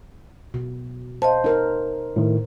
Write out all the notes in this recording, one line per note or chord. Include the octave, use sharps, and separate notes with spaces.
B2
C5 D#5 F5 A5
D#4 A#4
A2 D#3